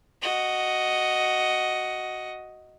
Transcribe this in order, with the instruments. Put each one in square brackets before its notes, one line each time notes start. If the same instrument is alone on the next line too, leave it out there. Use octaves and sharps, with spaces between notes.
[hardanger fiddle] F#4 D#5